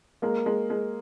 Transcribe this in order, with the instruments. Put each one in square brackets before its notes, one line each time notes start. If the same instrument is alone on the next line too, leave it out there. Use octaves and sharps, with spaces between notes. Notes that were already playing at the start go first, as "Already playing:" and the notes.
[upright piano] G#3 [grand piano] A#3
[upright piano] G#3
G#3